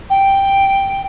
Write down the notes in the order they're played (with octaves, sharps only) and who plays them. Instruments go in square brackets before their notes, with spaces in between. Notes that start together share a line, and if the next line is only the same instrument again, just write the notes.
[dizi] G5